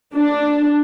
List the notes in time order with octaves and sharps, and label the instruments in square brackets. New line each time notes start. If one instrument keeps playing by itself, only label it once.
[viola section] D4